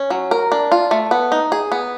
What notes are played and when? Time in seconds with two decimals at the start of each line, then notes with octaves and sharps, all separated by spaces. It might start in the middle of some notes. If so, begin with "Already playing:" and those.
Already playing: C#4
0.10 F#3
0.31 A#4
0.52 D4
0.72 F4
0.91 A3
1.11 B3
1.32 D#4
1.52 G#4
1.72 B3